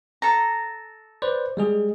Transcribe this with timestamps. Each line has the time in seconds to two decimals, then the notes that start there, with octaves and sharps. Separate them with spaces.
0.22 A4 A#5
1.22 B4 C5 D5
1.57 G3 G#3 G#4